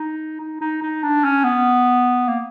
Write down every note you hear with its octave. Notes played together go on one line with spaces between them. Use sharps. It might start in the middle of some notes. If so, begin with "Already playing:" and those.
Already playing: D#4
D#4
D#4
D#4
D4
C#4
B3
A#3